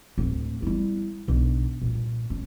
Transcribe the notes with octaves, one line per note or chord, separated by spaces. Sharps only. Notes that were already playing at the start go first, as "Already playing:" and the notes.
D1 C4
G3 E4
B1 D3
G2 A#2
C#4